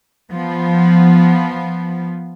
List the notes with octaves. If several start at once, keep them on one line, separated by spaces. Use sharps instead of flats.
F3 B3